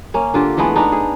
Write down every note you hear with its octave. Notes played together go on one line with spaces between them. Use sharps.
A#3 C#4
D3 F4 G4
E3 G#3 A3 B3
B3 D4 D#4
G#4